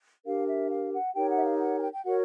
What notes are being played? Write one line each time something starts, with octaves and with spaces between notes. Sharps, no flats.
D4 G4 A#4 F5
E5
F5
F#5
D#4 G4 A#4 C#5 G5
F#5
E5
F5
F#5
G#5
G5
G5
F#4 A#4 C#5 F#5